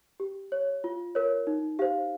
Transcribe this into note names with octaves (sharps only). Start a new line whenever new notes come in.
G4
C#5
F4
A#4 C#5
D#4
G4 C5 F5